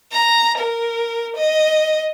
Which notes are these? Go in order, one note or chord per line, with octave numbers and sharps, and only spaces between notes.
A#5
A#4
D#5